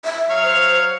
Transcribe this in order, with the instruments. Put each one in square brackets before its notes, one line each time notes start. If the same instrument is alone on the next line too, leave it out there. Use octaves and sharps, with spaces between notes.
[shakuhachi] E5
[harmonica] F#3 C#5 F5
[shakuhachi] C5